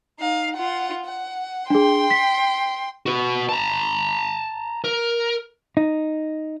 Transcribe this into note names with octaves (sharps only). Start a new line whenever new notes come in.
D#4 F5
F4 F#5
F#5
D4 G#4 G5 C6
B6
F#4 B4
A5 A#5
A#4
D#4